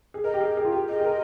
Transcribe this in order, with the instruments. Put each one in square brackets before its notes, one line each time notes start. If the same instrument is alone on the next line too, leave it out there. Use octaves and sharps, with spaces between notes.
[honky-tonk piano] G#4
[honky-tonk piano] A#4 [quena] D#5
[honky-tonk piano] G4
G#4
G#4
F4
G4
[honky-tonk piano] G#4 [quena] D#5
[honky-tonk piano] G#4
A#4